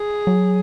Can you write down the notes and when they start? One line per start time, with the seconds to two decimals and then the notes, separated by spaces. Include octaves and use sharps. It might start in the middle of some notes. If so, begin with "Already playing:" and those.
Already playing: G#4
0.27 F#3